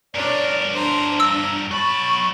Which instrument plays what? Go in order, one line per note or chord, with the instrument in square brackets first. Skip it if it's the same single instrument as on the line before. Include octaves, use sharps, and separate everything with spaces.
[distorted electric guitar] G2 A#4 [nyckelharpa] D4 C#5 [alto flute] D5
[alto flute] D4 [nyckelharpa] C5 A#5
[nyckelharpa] A#5 [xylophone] E6
[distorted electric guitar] F#3 B5 [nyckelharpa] A5 [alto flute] C#6